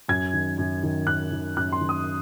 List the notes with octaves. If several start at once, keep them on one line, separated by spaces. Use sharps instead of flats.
F#2 G#6
D#3
F#2
D#3
F#2 F#6
D#3
F#2 F#6
C6
D#3
D#6